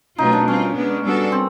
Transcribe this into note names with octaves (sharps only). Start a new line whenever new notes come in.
B2 F#3 A3 C#4 D#4 F4
D4
G3 C4 C#4 F4
G#3 B3 D4
G3 B3 D4 F#4 A4
C4